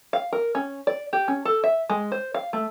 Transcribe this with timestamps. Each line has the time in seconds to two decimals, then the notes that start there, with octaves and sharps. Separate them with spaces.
0.13 F5
0.33 A#4
0.55 C#4
0.87 D5
1.13 G4
1.28 C#4
1.45 A4
1.64 E5
1.90 G#3
2.12 C5
2.34 F5
2.53 A3